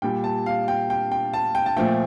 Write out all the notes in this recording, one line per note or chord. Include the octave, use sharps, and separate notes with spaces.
A#2 G3 G5
A5
F5
G5
G5
G5
A5
G5
A5
A#2 F3 A3 G5